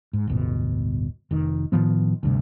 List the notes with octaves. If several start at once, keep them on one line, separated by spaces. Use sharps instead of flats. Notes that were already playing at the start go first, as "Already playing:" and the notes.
G#2
D1 G1 B2
F1 D#3
A2 D#3 F3 B3
D2 G2 C3